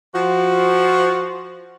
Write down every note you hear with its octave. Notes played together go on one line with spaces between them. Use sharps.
F3 F#4